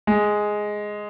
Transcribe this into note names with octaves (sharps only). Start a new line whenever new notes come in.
G#3